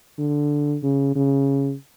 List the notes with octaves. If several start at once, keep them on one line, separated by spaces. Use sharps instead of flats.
D3
C#3
C#3